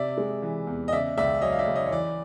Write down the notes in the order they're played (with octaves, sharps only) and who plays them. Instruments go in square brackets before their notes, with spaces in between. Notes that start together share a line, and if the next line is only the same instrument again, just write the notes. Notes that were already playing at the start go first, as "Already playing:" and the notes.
Already playing: [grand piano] C3 D5 E5
G#3
E3
E2
D#5
C#3 D5 E5
C#2 D5 E5
F#3 C#5 D#5
F5
D5 E5
C#2
C#5 D#5
C#5
E3 D5